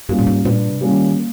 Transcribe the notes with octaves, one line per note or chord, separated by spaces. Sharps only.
G2 G3 A#3 C#4 F4
A#2
G#2
G2 A#2
C3
G3 A#3 C#4 F4
D#3
A#3